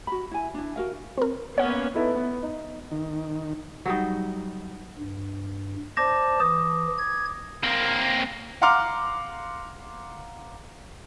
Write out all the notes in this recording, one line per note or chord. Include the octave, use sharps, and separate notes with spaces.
F#4 B5
E4 G#5
D4 E4
F#4 A#4 F5
C4 A#4
A#3 B3 C#4 C#5 F#5
B3 D#4 E4 A4 B4
B3
D#4
D#3
F#3 G3 D#4
G2
C5 D5 A5 D6 A#6
E3 D#6
G#6
A#3 C4
F5 F#5 A#5 C6 D6 F6